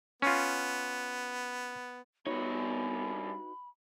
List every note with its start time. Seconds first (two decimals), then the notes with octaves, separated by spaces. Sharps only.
0.22 B3 C#4 F4
2.26 G2 B3 D#4 F#4 B4 C#5 B5